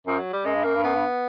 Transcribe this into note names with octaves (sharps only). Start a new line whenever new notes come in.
F#2 F3
F#3
G3
F#2 G#3
G2
F#2 A#3
G2
F#2 B3
G2